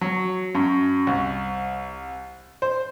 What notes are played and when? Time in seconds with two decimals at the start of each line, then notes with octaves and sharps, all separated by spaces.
0.01 F#3
0.55 F#2
1.07 C2
2.62 C5